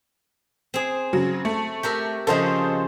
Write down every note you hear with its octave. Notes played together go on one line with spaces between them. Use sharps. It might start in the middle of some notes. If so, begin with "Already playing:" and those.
C4 G#4
C#3 F#3
A3
G4 A#4 E5
C#3 F3 C#4 A4 C5 D#5